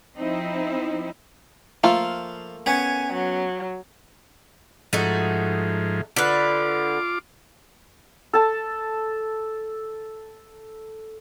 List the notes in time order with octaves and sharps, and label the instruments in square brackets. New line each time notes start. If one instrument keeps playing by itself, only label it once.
[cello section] F3 C4 D#4 E4
[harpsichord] F3 [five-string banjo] A3 A#3 F4
[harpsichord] B3 C#4 [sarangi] G#5
[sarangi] F#3
[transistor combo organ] G#2 F3 [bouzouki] A3 D#4 F#4
[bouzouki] D3 B4 [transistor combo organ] F4 D6
[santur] A4 A5